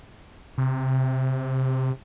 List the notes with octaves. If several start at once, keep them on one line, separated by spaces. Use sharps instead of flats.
C3